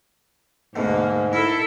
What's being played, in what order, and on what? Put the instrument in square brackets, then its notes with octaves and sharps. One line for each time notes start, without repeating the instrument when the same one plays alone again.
[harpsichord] D2 B2 D3 [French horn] G#2 [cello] A#3
[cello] E4 A4 [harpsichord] A#4